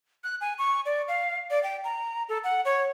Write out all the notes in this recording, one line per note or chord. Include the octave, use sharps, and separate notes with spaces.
F#6
G#5
C#6
D5
F5
D5
G5
A#5
A4
F#5
C#5